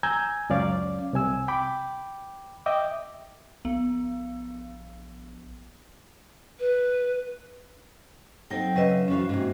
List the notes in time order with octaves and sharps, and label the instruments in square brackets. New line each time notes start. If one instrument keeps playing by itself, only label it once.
[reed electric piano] G#5 A#5 E6 G6 G#6
C#2 F#2 C#4 D5 F5 D6
C2 C3 G#5 E6
G5 B5 D6
D#5 E5 G5 D6
[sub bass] A#1 [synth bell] B3
[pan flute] B4
[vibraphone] F#3 G5 [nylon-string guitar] C4 D#4 A4
[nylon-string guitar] C#3 E5 [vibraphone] F#3 B4 D#5
[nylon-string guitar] F2 E3 F5 [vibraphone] C#4 F#4
[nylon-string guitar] G#2 C3 A#3 [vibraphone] F#4